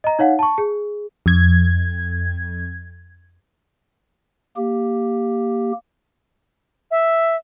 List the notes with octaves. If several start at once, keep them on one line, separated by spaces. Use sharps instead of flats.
D#5 A#5
D#4 C#5 F5 F#5
A5 C#6
G#4
F2 G#6
A#3 G4
E5